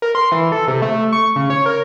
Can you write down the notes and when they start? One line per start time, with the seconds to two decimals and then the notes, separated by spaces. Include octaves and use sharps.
0.02 A#4
0.15 C6
0.32 E3
0.52 A4
0.68 C3
0.82 A3
1.13 C#6
1.36 C#3
1.50 C#5
1.66 A#4